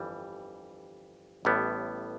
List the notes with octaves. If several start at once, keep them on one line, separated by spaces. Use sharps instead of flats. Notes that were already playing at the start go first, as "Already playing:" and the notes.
Already playing: G1 F2 E3 G3
A1 A2 G3 B3